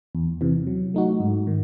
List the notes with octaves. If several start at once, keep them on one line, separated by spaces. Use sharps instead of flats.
E2
C3 E3
F#3
A3 D#4 F#4
G#2
D#3